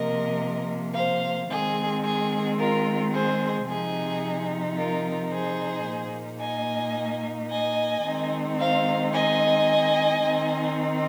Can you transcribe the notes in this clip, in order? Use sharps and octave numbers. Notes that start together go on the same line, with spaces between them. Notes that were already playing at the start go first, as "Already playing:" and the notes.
Already playing: C3 F3 A#3 A#4 D#5
C5 F5
D#3 G#3 C4 G#4
G#4
F4 A#4
G#4 C5
C3 F3 C4 D#4 G#4
F4 A#4
G#4 C5
A#2 A#3 D#4
D#5 G#5
D#5 G#5
D#3 G#3 C4 D#4
C5 F5
D#5 G#5
D#3 C4 D#4